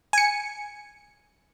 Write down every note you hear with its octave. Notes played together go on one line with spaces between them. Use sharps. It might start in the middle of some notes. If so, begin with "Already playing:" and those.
G#5 C#7